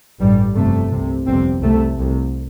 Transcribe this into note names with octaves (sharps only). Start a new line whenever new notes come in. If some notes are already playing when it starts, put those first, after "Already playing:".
A1 G2 G3
G1 F2 C3 A3
C2 C3
G1 F2 C3 C4
C2 C3 A3
C2 C3